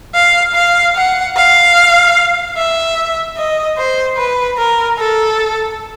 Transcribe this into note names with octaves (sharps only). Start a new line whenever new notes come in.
F5
F5
F#5
F5
E5
D#5
C5
B4
A#4
A4